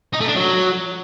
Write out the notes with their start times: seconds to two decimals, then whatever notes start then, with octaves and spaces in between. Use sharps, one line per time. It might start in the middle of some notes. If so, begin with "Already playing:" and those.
0.13 D#4
0.21 A3
0.28 D4
0.36 F#3